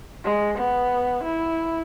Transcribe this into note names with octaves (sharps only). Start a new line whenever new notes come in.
G#3
B3
E4